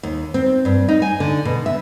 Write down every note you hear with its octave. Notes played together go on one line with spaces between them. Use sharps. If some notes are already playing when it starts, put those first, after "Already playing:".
D#2
C4
G2
D#4
G#5
D3
B2
E5